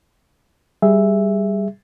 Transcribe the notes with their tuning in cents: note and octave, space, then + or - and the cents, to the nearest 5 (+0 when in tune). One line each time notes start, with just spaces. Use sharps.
G3 +0 G#4 -5 E5 +0